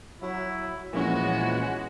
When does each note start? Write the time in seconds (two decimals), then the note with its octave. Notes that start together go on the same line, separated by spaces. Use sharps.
0.22 F#3 E4
0.93 A#2 E3 F3 G#3 B3 C#4 F#4